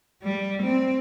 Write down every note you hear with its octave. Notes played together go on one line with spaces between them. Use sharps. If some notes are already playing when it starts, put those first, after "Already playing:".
G3
C4